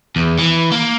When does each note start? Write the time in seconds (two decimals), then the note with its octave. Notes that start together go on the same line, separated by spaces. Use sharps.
0.16 E2
0.39 E3
0.72 A#3